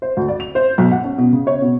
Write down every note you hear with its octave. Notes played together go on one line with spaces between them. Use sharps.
C5
D2
D5
F7
C5
B1
F#5
C#4
B2
C#3
C#5
B2